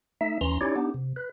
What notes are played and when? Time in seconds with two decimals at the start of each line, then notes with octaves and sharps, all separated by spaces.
0.21 A3 D#4 E5
0.41 D#2 E3 C#4 A#5 C6
0.61 C#4 D#4 E4 G4 C#5 D5
0.76 B3 D4 D#4 G4
0.94 C3
1.16 B4